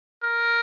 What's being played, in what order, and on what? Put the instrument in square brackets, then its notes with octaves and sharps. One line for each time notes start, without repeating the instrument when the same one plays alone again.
[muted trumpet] A#4